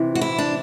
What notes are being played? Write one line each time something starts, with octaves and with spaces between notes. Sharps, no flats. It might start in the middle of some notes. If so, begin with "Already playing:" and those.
Already playing: C3 E3
F#4
E4
D4